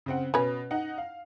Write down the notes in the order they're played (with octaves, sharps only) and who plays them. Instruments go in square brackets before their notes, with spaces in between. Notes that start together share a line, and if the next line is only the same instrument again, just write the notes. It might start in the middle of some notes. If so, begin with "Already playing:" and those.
[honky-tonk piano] C#3 C4 F#5
[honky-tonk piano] B2 [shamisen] C#4 B4
[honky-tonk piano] D#4 F#5
F5